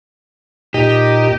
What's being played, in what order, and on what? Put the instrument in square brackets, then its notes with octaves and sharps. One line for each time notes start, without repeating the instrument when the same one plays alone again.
[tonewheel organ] A#2 D#4 D#5 [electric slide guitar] G4